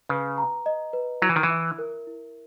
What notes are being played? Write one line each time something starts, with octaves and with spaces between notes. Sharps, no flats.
C#3 B4
A#5
D#5
B4
F#3 E4
E3
D#3
E3
E5
A#4
E4